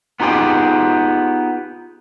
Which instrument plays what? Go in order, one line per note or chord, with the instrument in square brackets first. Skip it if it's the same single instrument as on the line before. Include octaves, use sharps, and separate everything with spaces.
[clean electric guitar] B3 D#4 F4 G4 G#4